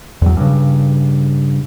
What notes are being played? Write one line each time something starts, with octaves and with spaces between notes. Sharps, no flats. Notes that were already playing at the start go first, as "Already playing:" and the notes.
E2 F#3
G2 C#3